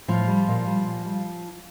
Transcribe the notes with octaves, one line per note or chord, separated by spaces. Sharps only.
A2 F3 F4
G3
A#2
G3
A#2
G3